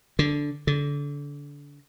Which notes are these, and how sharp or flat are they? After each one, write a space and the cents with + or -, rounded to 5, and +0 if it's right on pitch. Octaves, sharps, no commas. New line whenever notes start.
D3 -5
D3 -30